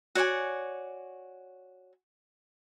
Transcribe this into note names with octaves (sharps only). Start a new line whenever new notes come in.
F#4 C#5 D5 G#5